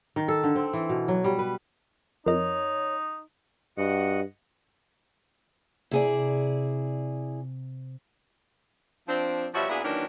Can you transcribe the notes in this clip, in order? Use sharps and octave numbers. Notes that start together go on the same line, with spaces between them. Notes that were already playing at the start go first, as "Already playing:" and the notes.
D#3
A4
D3
C4
E3
B2
F#3
G3
B4
F2 D#4 A#4 C#5 D#5
G2 F#4 D#5 F#5
C3 E4 G#4 D5
F3 C4 D4
B2 F3 G3 F#4 C#5 E5
A#2 B3 D4 E4 F#4 G#4
D#3 E3 F#3 A#3 C#4 D4